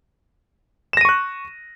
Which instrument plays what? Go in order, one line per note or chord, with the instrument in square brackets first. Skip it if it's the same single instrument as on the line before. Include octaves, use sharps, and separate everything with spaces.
[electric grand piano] E7
A#6
D#7
C#6
F#6